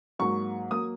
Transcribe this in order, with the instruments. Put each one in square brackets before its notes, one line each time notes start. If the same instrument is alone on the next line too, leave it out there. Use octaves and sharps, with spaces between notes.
[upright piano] G#2 F#3 A#3 C#6
F#3 A#3 D#6